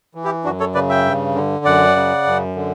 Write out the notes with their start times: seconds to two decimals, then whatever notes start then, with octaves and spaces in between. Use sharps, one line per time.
0.15 E3
0.24 E4 G4
0.44 F#2 D4 F#4
0.60 A4 C#5
0.74 C#3 B4 D5
0.90 E5 G5
1.06 G2
1.35 D3
1.65 F#2 D5 F#5
1.96 C#3
2.26 F#2
2.56 D3